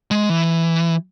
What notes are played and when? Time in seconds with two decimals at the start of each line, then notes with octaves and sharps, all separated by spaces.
0.11 G#3
0.29 E3